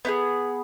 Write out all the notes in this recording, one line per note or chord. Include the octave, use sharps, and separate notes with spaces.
B3 D#4 G#4